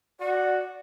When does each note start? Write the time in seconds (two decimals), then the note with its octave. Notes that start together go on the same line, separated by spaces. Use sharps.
0.20 F#4 D5